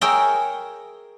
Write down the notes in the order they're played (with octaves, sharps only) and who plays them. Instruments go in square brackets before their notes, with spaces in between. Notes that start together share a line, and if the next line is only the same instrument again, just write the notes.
[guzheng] G#4 A#4 C#5 E5 G5 A#5